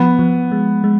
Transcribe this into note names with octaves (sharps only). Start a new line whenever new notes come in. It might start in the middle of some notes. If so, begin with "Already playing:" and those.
Already playing: F3 B3
F3
G#3
G#3